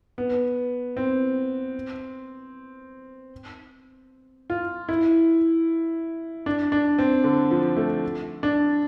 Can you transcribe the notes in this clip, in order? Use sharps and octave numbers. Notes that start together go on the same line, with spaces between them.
B3
C4
F4
E4
D4
D4
C4
D3
F3
A3
D4